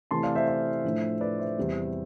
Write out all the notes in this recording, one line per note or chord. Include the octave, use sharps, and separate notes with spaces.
C3 E3 A3 A5 C6
D5 F5
C5 E5
C5 E5
A2 F3 A3 D4
B4 D5
C5 E5
E2 C3 G3